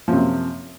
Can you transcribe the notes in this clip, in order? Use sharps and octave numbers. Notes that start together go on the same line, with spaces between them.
F#2 C3 F3